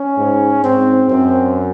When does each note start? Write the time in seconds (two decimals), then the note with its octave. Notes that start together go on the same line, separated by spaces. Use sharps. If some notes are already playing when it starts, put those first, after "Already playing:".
Already playing: C#4
0.17 G#2
0.64 G#2 C4
1.09 F#2 C4